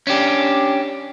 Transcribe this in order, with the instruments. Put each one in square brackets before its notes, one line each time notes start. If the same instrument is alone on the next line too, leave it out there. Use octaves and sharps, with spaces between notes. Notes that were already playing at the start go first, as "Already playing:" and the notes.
[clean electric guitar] C#4 D4 G4